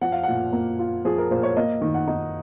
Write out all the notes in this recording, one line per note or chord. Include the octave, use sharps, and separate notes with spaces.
F3 F#5
F5
A#2 F#5
A#3
F4
F3 G#4
A#4
A#2 C5
C#5
A#3 D#5
D#3
F#5
D#4